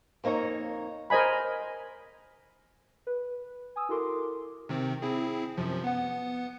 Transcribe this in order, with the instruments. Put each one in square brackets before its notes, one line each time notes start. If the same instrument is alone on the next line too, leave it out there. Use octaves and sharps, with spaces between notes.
[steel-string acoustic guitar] F2 A#3 D#4 C#5 A#5
[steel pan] A#4 C5 D#5 G#5 B5
[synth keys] B4
G#5 D#6 E6
E4 F#4 A4 A#4 C6 D6
[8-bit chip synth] C3 D#3 C4
C4 E4 G#4
F#2 C3 F3
B3 F#5